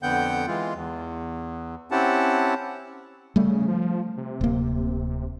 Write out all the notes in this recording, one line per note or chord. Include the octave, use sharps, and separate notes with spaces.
F2 D3 B3 F#5 G5 G6
E3 G#3 F4
E2
C4 C#4 E4 G4 F#5 A5
C#3 G3 A3
F3
C3
D1 A#3